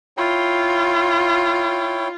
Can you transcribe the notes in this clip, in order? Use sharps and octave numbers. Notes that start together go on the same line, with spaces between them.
E4 F4 C#5 G5